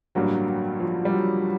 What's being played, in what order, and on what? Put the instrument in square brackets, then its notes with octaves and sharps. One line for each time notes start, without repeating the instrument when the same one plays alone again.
[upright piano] A1 G2 D3 G3 A#3 [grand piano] F#3
[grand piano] F#3
F3
G3
F#3